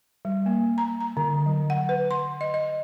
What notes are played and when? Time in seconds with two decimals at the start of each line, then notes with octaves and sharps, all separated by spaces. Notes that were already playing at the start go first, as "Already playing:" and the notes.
0.25 G3
0.46 A#3
0.78 A#5
1.01 A#5
1.17 D3
1.46 F#3
1.70 F#5
1.89 B4
2.11 C6
2.41 D#5
2.54 D#5